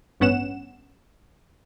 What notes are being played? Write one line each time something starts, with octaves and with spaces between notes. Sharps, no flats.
A1 G2 B3 C#4 F#5 E7